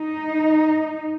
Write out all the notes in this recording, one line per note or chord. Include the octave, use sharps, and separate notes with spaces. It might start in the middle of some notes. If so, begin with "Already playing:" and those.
Already playing: D#4